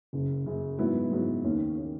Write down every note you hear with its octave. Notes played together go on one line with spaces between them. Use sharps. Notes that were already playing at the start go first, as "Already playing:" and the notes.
F#1 F#2 C#3
F#1 F#2 C#3
G#2 F#3 B3 E4
G#2 F#3 B3 E4
D#2 D#3 A#3 C#4
D#3 A#3 C#4